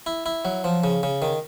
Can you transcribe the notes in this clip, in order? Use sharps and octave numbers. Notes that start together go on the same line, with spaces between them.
E4
E4
F#3
F3
C#3
C#3
D#3